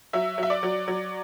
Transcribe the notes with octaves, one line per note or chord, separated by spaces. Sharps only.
F#3 E5
F#3 E5
D5
F#3
F#3